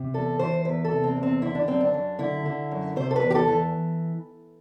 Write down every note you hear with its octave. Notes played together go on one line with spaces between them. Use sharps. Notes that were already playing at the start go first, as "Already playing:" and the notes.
Already playing: C3
E2 A4
E3 C5
E2 B4
A4
C3
C4
E2
C4
D3 E4
D4
F#2 C4
D4
F#2
D3 E4
D3
F#2
C3 C5
A4
B4
E2
G4
A4
E3